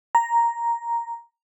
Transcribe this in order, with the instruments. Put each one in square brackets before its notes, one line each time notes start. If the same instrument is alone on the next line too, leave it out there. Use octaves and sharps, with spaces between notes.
[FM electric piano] A#5